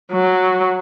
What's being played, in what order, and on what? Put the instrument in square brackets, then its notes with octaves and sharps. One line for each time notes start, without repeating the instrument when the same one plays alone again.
[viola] F#3